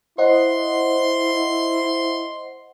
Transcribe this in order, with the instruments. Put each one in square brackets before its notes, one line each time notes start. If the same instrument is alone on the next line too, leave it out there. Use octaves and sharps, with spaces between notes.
[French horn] E4 [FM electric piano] C5 D#5 F#5 [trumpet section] C6